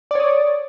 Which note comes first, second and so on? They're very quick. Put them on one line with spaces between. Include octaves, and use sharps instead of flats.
D5 C#5 D#6